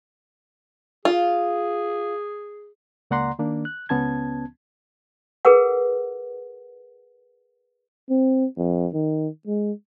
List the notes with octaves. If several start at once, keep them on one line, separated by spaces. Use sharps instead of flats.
F4 G#4
C#2 A#3 D5 F#5 A#5 C6
D#3 A#3 D4
F#6
C#2 B3 C#4 A5 G#6
G#4 A#4 B4 F#5
C4
F2
D#3
G#3